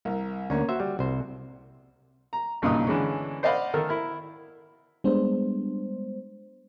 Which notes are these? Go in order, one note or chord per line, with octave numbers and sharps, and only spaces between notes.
C2 A#4
D2 A#3 C#4
F#4 C5 E5
G3
C2 C5
A#5
B1 G2 A#2 C#3 D#4 D#6
D3 E3 G#3 C#4
C5 D5 D#5 F5 F#5 B5
D#3 A4 A#4
E4 A#4
G3 G#3 B3 D4 C5